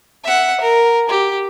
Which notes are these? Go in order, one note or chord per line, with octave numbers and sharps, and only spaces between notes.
E5 F#5
A#4
G4